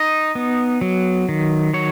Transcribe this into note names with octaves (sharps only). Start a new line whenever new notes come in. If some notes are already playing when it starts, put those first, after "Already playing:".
Already playing: D#4 D#5
B3
F#3
D#3
F#3 C#5